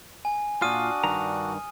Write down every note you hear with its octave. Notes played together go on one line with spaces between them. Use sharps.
G#5
A#2 D4 F4 F#4 D#6 F6 D#7
G2 D#3 A#5